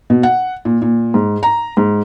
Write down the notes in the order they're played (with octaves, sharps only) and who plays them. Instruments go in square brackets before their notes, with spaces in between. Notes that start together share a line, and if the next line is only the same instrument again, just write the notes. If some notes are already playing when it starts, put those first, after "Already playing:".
[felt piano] B2
F#5
A#2
A#2
G#2
A#5
G#2